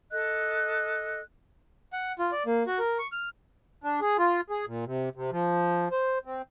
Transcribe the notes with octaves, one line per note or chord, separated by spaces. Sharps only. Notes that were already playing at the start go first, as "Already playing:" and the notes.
A4 D#5 F#6
F#5
F4
D5
A#3
F#4
A#4
C#6
F6
D4
G#4
F4
G#4
A#2
C3
C3
F3
C5
C4